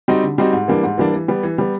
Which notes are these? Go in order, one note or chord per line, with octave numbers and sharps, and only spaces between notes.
G3 C4 D#4 F#4
D3
G3 C4 D#4 F#4
G#2
E3 G3 A#3 D4
G#2
E3 G3 A#3 D4
E3
G3 B3
E3
G3 B3